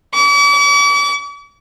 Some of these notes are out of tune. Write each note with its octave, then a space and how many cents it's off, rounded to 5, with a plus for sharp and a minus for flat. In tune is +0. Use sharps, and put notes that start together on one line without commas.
D6 -45